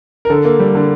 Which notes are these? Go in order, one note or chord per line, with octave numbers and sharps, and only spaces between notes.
A#4
D3 A4
A#3
G3
D3